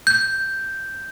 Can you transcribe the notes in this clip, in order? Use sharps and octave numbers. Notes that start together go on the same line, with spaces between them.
G6